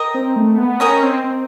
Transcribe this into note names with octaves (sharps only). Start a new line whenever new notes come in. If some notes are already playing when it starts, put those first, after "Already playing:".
Already playing: A#4 D#5 G5 A#5
C4
A3
B3
C#4 A#4 D#5 G5 A#5
C4
C4